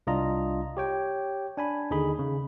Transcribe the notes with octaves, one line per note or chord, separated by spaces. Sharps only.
C2 D4 F4 D#5 A#5
G4 C#5 G5
D4 G#5 B5
D#2 D3 D#4 G#4 B5
C#3